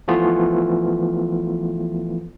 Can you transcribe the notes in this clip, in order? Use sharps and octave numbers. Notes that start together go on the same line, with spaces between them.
E3 F3 A3 B3 F4